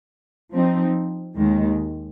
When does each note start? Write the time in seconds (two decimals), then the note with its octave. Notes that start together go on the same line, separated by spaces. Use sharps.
0.52 F3 C4 D#4
1.36 D#2 D#3 G#3